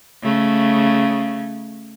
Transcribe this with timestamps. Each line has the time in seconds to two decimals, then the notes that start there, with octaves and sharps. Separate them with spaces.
0.23 C#3 A3